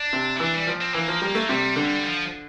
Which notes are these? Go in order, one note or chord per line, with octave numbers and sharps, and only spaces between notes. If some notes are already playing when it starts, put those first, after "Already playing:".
Already playing: D4
C3
E4
E3 D4
G3
F3
C4
E3 A#3
F3
G3
A3
C3 G3
D3
F3